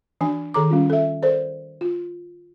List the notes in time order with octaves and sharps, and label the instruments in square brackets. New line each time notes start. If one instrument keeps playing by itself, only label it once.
[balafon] E3 D4 G#5
D#3 G#4 A4 A#5 D6
G3 C#4 F4
A4 E5
A4 A#4 C5 D5
F4